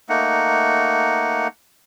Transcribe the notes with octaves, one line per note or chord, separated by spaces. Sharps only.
A3 A#3 D#4 F#5